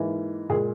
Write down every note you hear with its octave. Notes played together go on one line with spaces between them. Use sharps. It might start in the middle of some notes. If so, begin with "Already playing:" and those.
Already playing: G#2 E3 A#3
A#2 G#3 G#4